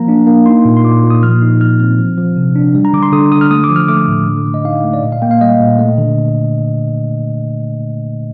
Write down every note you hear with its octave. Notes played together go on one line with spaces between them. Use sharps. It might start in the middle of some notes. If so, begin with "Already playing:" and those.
Already playing: F3 A#3 A#5
D4
A#3
D#4 C6
A#2
C6
A#2 D6
A#2
D#6
F3 F6
D#4
F3 F6
C4 F6
F3
F3
C3
D4
G3
A#5
D3 D6
C6
D3 D#6
D3 D#6
F6
A3 D#6
D6
F3
F6
A3 D6
A2
D3
A3
D#5
D#4 F5
A3
D5
A#2 D#5
F5
A#3 G5
F5
G3 D#5
A#2
A3
D3